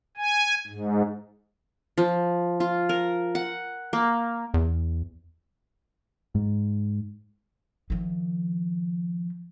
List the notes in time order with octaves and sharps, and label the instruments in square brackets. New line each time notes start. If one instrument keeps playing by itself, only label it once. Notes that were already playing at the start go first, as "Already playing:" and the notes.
[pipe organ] G#5
G#2
[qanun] F3
F4
A#4
F#5
A#3
[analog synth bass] E2
[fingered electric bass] G#2
[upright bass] D#3 F3